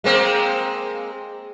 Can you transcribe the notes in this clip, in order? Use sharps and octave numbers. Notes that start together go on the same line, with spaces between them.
G#3 A#3 C4